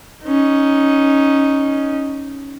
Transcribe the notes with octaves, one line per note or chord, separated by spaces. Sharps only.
C#4 D#4